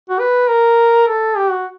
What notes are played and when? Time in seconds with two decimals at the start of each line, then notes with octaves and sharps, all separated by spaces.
0.09 F#4
0.20 B4
0.49 A#4
1.07 A4
1.37 G4
1.51 F#4